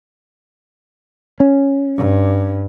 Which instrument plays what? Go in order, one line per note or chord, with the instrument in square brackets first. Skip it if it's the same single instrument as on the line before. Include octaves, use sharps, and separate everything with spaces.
[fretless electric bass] C#4
[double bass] G2